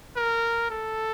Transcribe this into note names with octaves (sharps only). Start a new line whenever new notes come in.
A#4
A4